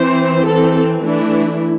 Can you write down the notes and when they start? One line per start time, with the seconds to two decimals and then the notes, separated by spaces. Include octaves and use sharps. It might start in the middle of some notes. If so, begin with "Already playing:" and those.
Already playing: E3 C4 C5
0.46 E3 C4 A4
1.02 E3 A3 D4 E4